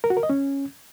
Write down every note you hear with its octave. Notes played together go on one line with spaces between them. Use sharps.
A#4
F#4
A#4
D#5
C#4